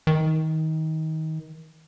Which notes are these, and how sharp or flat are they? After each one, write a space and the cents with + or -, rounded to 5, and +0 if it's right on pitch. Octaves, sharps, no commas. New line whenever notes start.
D#3 +25